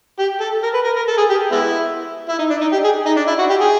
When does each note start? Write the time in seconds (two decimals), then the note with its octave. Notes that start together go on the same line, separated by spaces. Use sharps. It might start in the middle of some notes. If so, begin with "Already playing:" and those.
0.19 G4
0.40 A4
0.63 A#4
0.74 B4
0.85 A#4
0.96 A#4
1.08 A4
1.18 G#4
1.30 G4
1.52 G#3 B3 E4
2.29 E4
2.39 D#4
2.50 D4
2.61 D#4
2.72 G4
2.84 G#4
3.06 D#4
3.17 D4
3.28 E4
3.39 F#4
3.50 G4
3.60 G#4